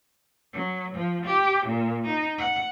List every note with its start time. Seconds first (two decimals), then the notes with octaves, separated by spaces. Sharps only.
0.53 F#3
0.95 F3
1.26 G4
1.66 A#2
2.06 D#4
2.38 F#5